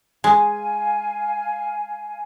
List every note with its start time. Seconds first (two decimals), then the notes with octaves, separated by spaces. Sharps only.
0.24 G#3 F5 G#5